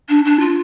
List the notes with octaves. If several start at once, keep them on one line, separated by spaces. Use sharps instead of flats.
D4
D4
F4